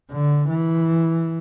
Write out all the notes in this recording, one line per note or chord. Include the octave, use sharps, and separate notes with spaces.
D3
E3